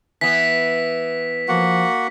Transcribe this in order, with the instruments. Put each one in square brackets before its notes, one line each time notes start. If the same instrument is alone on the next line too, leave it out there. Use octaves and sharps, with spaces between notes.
[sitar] E3 B3 [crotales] B6
[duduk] F3 [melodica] A#3 F#4 F#5